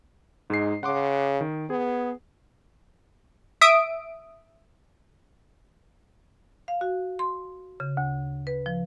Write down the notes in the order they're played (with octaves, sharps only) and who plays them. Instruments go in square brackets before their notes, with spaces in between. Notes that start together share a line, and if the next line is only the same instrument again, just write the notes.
[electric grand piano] G#2 G#3 C7 [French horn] D#4
[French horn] C#3 [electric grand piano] F#5 C6 D6
[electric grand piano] D#3
[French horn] B3 [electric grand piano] G#4
[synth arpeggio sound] E5 D#6 D7
[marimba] F5
F#4
C6
C#3
D2
B4
F3